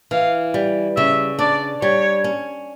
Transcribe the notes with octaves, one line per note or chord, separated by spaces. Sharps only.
E3 F5
G3
C#3 E5
D4 D5
G3 C#5
C#4